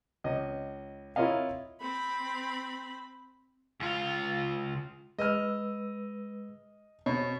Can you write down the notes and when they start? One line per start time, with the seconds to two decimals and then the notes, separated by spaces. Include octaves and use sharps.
0.24 C#2 D#5
1.16 E4 F4 A#4 C#5 D#5 F5
1.81 C4 B5
3.80 C#2 F4
5.19 G#3 B4 D#5 E6 F6
7.06 B2 C4 C#5